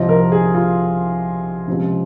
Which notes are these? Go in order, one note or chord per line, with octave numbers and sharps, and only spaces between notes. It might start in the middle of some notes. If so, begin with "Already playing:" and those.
Already playing: C2 C3 F3 D#5
A#4
G#4
F4
C#2 C3 F3